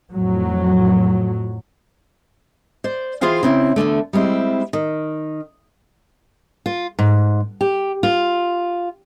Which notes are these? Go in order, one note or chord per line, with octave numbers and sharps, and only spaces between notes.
F2 A2 F#3
C5 D5
E3 F4 G#4 C5 F5 G5
C#3 C4 E4
E2 G2 D3 A3
G3 G#3 C4 E4
D#3
F4
G#2
G4
F4